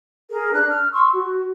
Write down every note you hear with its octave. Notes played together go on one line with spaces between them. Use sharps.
G#4 A#4
D4 F#6
F6
C6 C#6 E6
F#4